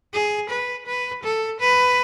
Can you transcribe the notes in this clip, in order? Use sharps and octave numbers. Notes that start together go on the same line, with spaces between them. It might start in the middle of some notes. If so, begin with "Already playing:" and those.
G#4
B4
B4
A4
B4